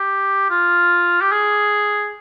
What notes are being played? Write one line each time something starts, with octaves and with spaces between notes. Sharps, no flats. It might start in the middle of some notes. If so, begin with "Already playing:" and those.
Already playing: G4
F4
G4
G#4